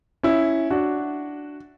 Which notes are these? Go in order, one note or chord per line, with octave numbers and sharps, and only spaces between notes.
C#4 E4
D4 F#4